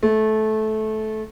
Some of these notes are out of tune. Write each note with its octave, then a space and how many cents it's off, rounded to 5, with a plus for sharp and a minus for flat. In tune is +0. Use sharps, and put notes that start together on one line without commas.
A3 -20